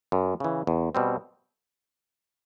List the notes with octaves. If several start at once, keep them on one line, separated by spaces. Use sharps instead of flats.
F#2
C#3 E3
E2
B2 G3 C4